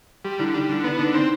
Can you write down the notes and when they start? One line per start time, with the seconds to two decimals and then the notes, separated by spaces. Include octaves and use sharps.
0.25 G3 G4
0.39 D3 E4
0.54 G3 D#4
0.69 D3
0.84 B3 E4
0.99 D3 D#4
1.14 C4 D#4